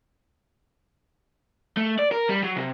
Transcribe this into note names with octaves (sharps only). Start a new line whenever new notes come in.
A3
D5
A#4
G3
F#3
C3